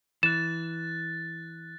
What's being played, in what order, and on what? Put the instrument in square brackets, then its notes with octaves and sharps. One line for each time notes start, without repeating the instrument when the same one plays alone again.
[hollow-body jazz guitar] E3 [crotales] F#6 A6 [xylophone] E7